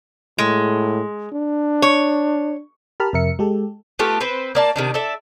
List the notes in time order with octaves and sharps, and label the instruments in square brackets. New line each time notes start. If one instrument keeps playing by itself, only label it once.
[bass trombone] A2 [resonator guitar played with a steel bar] G#3
[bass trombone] D4
[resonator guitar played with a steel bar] C#5
[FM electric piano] G4 A#4 A5 B5 F6
F2 C3 A#4 E5 C#7
G#3 G4 A4
[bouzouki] A3 B3 F4 G4
C4 B4 C5
A#3 D5 A5
C3 D#3 D4
A4 D5 E5